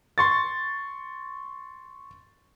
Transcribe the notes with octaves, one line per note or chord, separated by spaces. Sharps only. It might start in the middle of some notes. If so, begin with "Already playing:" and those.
C6 C#6 A6